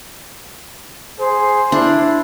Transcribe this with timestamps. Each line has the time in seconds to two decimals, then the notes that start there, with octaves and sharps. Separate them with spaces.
1.19 G#4 C5
1.72 D4 E4